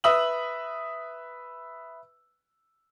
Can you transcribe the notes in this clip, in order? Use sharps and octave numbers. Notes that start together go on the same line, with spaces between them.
B4 E5 D#6 E6 F#7